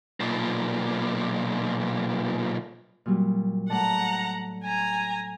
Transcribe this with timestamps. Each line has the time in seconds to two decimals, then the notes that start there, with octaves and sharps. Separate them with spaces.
0.20 B1 A#2
3.06 A#2 F#3 G3
3.70 A2 D5 F#5 A5 A#5
4.64 G#5 A#5